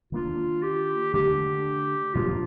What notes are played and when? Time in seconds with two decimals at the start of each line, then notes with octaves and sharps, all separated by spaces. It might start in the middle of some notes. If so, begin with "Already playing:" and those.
0.12 D#3 A#3 D4 F4
0.63 G4
1.13 D3 A3 D4 G4
2.14 A#2 F3 A#3 D4 F4